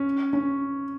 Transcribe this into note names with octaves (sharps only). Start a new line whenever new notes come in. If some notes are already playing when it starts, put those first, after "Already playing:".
Already playing: C#4
C#4